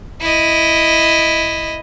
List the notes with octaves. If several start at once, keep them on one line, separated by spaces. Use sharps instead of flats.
E4 D#5